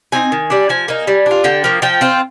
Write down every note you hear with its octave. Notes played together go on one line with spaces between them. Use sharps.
C4 D#4 G#5
D#3
G3 D4
F3 G#5
A#3 D#4
G3
D4 F4
D3 G5
F3 A#3
F3 G5
C4 F4